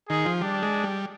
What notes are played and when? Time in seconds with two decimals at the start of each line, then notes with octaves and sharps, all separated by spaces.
0.09 D#3 G#4
0.25 F3
0.41 G3 D4
0.62 G#3
0.83 G3